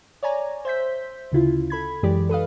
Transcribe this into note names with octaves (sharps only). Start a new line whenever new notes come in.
C#5 D5 G#5 A#5
C5 E5 G6 B6
D2 C#3 E4 F4
A4 B5 G#6
F#2 E3 G#3 G4 D5
A4 B4 D#5 F5